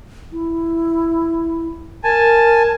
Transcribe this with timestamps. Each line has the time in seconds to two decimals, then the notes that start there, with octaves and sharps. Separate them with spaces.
0.32 E4
2.04 A#4 G#5 A5